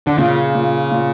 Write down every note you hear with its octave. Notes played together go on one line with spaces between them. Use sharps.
D3
A#2 C#3
A#2
A#2